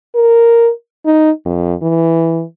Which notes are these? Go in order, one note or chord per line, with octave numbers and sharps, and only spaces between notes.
A#4
D#4
F2
E3